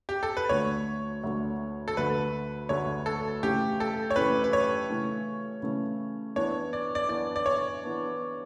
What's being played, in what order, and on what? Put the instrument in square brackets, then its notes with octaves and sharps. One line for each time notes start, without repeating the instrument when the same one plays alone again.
[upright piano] G4
A4
B4
[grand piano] D2 D3 A3 [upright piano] C#5
[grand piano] D2 D3 A3
[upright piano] A4
[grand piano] D2 D3 A3 [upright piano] B4
[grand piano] D2 D3 A3 [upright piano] C#5
[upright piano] A4
[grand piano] C#3 E3 A3 C#4 [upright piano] G4
[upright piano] A4
C#5
[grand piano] C#3 E3 A3 C#4 [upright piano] B4
[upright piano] B4
C#5
[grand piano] C#3 E3 A3 C#4
C#3 E3 A3 C#4
[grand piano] E3 B3 D4 [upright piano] C#5
[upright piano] D5
D5
[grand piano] E3 B3 D4 [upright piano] D5
[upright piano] D5
C#5
[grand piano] E3 B3 D4